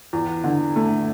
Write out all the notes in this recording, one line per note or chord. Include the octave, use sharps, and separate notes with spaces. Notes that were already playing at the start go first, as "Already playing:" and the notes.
E2
D3
A3